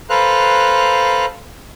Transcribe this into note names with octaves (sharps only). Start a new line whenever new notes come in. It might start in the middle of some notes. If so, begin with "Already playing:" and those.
A4 B4 C5 F5 A#5 F#6